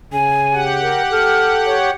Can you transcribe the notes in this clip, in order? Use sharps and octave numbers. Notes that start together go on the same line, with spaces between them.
C#3 G#5
G4 F#5
A#4
A4 F6
C#5